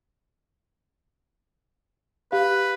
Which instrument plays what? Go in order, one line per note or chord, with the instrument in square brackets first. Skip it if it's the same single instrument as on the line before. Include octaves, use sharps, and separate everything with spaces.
[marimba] G4 F5 [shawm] B4